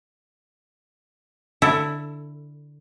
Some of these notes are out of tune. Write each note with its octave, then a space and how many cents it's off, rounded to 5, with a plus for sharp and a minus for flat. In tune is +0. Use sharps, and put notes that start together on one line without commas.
D3 +0 E4 +0 A4 +20